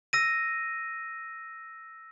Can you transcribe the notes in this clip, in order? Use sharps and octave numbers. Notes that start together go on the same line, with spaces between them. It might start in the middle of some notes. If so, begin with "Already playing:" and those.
E6 A#6 D#7